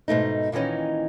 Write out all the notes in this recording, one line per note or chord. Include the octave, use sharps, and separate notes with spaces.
G#2 B2 A3 D#4
A#2 D#3 E3 C#4 D#4